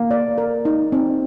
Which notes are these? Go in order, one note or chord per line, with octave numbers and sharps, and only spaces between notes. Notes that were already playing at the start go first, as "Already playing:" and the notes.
Already playing: A#3
D5
A#4
D#4
C4